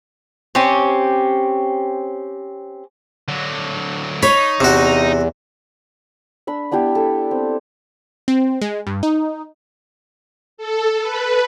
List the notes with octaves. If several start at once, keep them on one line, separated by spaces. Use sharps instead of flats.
C4 C#4 G4
D3 F#3
D#4 C#5 B5
E2 C3 F#4
D4 B5 E6
B3 D4 E4 G4
A4
C4
C4
G#3
G2
D#4
A4
B4